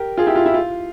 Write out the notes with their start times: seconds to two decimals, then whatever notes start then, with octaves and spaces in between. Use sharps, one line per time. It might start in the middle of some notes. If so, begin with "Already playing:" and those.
Already playing: G4 A#4
0.18 F4 G#4
0.27 E4 G4
0.36 F4
0.46 E4
0.54 F4